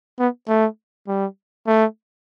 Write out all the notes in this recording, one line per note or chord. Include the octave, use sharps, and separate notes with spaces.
B3
A3
G3
A3